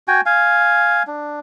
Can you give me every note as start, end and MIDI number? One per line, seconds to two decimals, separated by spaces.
0.08 0.21 66
0.08 0.21 79
0.08 0.21 80
0.26 1.03 77
0.26 1.03 80
1.07 1.40 62